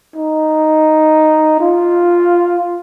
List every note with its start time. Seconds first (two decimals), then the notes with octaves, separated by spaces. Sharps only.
0.16 D#4
1.60 F4